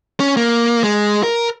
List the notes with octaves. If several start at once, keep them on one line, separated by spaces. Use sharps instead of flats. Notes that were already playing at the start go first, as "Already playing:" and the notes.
C#4
A#3
G#3
A#4